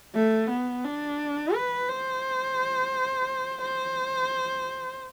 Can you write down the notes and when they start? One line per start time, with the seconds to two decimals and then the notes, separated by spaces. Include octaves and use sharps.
0.15 A3
0.50 B3
0.85 D4
1.54 B4
1.89 C5
3.62 C5